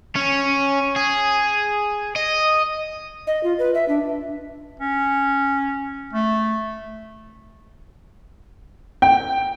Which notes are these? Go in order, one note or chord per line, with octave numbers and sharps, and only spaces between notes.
C#4
G#4
D#5
D#5
F4
B4
E5
D4
C#4
A3
G5